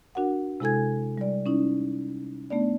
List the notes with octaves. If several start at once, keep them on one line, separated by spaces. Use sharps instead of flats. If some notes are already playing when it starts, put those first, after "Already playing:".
D4 F#4 A#4 F#5
C3 G#3 E4 A4 G#5 G#6
G3 D5
C#4 D#4 E4
A3 B3 D4 D5